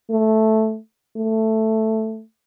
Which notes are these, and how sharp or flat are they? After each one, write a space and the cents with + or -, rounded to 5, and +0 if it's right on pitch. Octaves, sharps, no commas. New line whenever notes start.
A3 -5
A3 +5